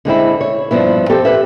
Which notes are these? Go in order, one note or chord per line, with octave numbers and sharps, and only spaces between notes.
D3 G#3 C4 E4
C#5
G2 F3 B3 E4
C4 G4 A4
G4 B4 E5